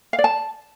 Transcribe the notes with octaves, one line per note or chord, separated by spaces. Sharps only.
F5
D5
A5